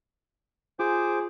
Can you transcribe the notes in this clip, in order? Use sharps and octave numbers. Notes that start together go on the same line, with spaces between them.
F4 G#4 C5 D6